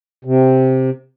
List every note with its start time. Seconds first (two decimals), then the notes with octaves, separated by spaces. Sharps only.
0.25 C3